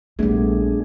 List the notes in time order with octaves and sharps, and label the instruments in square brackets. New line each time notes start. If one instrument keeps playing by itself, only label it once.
[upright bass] A#1 G3 [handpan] A3 B3 [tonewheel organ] D4 G#4